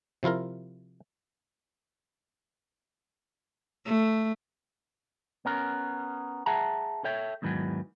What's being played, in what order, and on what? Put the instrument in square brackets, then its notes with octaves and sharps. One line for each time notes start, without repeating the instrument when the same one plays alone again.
[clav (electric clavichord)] C3 F3 E4 F4 A#4
[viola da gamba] A3
[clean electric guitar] B3 C#4 A#4
G#4 E5 F#5 A5 A#5
A4 C#5 E5 G5
E2 G#2 D#3 E3 F#3